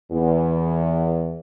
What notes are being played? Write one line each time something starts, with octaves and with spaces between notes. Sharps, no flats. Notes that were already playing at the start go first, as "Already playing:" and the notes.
E2